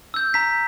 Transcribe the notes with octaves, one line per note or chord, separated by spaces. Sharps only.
E6 G6
A#5 B6